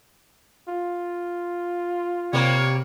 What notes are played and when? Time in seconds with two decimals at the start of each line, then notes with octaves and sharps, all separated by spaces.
0.68 F4
2.33 C3 G3 A#3 C#5